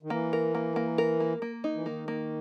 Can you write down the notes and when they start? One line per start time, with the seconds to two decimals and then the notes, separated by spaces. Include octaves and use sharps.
0.03 D#3
0.10 E3 A#3
0.33 A#4
0.55 A#3
0.76 A#3
0.98 A#4
1.20 A#3
1.42 A#3
1.64 D#4
1.75 E3
1.86 D#3 A#3
2.08 A#3